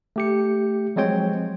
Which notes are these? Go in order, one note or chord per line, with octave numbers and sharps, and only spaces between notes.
A3 G4 C#7
F3 F#3 G#3 C4 C#5 G5